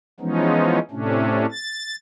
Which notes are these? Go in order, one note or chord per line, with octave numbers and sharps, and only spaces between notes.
E3 F3 G#3 B3 C#4 D#4
A2 C3 A3 C#4 D4
A6